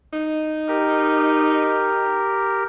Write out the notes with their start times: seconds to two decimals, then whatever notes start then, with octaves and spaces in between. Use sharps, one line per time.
0.13 D#4
0.68 G4 A#4